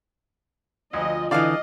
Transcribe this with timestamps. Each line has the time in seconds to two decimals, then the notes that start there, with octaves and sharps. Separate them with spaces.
0.93 D2 F3 D#5
1.31 D3 E3 D5 D#5 F5